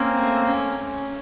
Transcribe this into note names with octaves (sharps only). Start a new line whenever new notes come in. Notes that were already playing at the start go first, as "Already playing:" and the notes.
Already playing: A#3 C4 C#4
A3
C#4